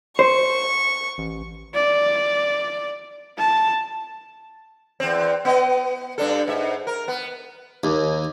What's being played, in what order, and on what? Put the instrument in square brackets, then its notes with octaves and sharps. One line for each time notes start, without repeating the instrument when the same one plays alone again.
[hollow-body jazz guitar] C5 [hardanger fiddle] C#6
[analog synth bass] A1
[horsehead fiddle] D5
A5
[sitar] E2 C4
B3 D#5
G2 D4 A4
G#2 E5
A#4
B3
[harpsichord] D#2